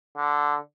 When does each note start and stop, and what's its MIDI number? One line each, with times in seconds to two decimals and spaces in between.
0.16 0.57 50